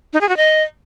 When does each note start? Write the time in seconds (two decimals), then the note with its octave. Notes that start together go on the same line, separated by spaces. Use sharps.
0.13 D#4
0.21 G#4
0.29 F#4
0.37 D#5